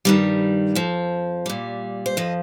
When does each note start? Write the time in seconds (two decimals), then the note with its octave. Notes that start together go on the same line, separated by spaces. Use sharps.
0.05 G2 D#3 G3
0.75 F2 F3
1.46 A#2 G3
2.06 C5
2.17 F2 F3 D#5